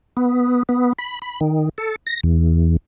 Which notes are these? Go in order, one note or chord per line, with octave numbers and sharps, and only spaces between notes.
B3
B3
B5
B5
D#3
A4
A#6
E2